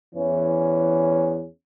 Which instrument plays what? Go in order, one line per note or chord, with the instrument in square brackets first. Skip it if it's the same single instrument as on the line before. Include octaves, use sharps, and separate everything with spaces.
[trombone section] E2 E3 C#4